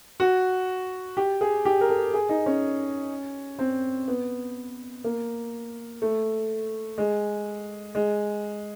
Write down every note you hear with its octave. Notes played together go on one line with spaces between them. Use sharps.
F#4
G4
G#4
G4
A#4
A4
G#4
D#4
C#4
C4
B3
A#3
A3
G#3
G#3